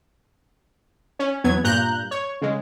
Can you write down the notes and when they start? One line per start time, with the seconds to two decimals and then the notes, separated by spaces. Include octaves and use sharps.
1.19 C#4
1.44 E2 F#3 B3 G#6
1.64 G2 A#2 A#5 F#6 G6
2.11 C#5
2.41 C#3 G#3